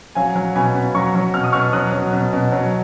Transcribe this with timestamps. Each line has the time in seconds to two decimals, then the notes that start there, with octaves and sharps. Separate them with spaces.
0.15 F#3 F5 G#5
0.36 F#3
0.55 B2 G#5 B5
0.74 B2
0.95 F#3 A#5 C#6
1.15 F#3
1.34 B2 F6
1.44 D#6
1.52 B2 C#6 F6
1.73 F#3 D#6 F#6
1.93 F#3
2.13 B2
2.33 B2
2.52 F#3